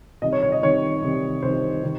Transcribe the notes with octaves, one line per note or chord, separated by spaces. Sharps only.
C2 C3 D#3 D#5
C#5
C#5
D#5
C2 C3 D#3 C#5
C2 C3 D#3
C2 C3 D#3 C5
C3 D#3